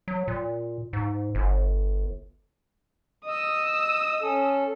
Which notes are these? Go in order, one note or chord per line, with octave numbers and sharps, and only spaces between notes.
F#3
A#2
G#2
G1
D#5 D#6 E6
C#4 A4